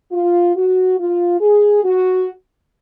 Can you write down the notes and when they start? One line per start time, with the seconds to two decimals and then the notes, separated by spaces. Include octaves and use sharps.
0.12 F4
0.56 F#4
0.98 F4
1.41 G#4
1.84 F#4